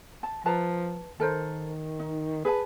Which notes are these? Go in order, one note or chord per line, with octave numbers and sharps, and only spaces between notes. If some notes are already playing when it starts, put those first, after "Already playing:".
A5
F3 B4 A5 A#5
D#3 A4 A#4 C5
D#4
G#4 B4 A5